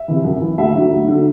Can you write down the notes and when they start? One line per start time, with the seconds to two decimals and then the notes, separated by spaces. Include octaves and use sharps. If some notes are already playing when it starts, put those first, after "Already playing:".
Already playing: E5
0.08 C3 E3
0.24 F#2
0.41 E3
0.58 D2 E5
0.75 D3 F#3
0.92 D2
1.08 D3 F#3